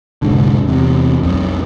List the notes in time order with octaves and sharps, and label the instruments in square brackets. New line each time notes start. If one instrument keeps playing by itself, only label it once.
[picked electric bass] F1 C2 G#2 D3
E2 C3
B1 F2